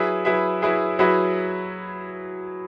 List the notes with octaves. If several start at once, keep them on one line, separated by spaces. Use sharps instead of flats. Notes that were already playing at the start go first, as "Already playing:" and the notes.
Already playing: F#3 E4 G#4 B4 E5
F#3 E4 G#4 B4 E5
F#3 E4 G#4 B4 E5
F#3 E4 G#4 B4 E5